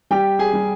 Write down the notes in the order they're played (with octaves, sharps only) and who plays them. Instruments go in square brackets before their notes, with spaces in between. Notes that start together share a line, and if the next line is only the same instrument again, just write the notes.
[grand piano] G3 G4 G5
G#4 G#5
G3